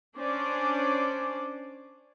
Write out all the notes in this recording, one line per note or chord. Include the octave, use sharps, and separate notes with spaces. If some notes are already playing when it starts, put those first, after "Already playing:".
C#4 D4 C5 D5